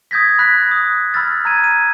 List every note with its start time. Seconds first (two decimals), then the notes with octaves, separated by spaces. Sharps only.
0.11 D#6 G6 G#6 A#6 B6
0.39 B5 F#6 A#6 B6
0.71 D#6
1.14 B5 E6 F6 A6
1.45 A#5 G#6 D#7
1.64 D#7